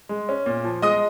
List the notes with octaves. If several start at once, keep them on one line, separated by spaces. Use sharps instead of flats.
G#3
C#4
A#2
F3
G#3 D#5 D#6